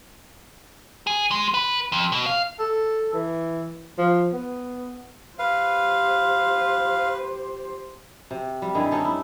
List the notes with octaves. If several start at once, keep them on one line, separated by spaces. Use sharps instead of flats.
G#4
G#3
B4
F2
B2
F5
A4
E3
F3
B3
G4 B4 C5 F5
C3
G3
G2 D#3 E4 G#4
C#4 D#4 A4
E4